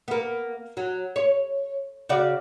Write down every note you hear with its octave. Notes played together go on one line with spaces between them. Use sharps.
A#3 B3
F#3
C#5
C#3 F#4 D5